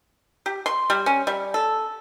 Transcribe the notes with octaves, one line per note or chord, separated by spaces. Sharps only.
G4
C6
G3
C#4
G3
A4